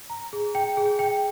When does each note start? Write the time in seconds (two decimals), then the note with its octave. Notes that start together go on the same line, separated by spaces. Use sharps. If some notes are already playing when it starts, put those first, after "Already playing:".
0.10 A#5
0.33 G#4
0.55 G5
0.77 G#4
0.99 G5